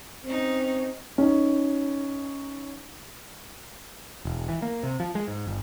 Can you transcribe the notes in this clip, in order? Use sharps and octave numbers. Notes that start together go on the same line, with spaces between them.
C4 C#4 D#4
C#4 D#4
E1
E3
A#3
C3
F3
G#3
G#2
G1